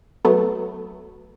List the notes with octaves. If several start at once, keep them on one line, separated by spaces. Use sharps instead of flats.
F#3 A3 B3